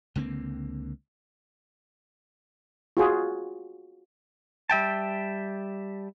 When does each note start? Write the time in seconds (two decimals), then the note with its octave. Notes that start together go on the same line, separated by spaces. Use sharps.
0.16 C#2 D3 A#3 C4
2.97 F4 F#4 G#4
4.70 G3 E5 G5 A5